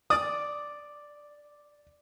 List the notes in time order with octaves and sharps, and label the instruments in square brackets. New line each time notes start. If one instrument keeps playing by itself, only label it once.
[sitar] D5 [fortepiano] D#6